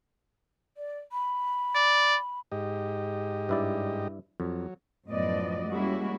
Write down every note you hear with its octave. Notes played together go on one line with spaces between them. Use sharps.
D5
B5
D5
G#2 G4 D#5
G2 E4 D5
F2 F#3
F#2 A2 F3 B3 D5 D#5
G3 G#3 A#3 C#4 E4 F#4